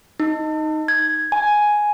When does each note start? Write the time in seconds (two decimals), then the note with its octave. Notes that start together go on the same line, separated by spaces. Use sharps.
0.20 D#4
0.88 G#6
1.32 G#5